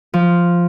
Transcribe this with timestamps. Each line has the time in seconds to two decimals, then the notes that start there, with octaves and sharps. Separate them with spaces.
0.14 F3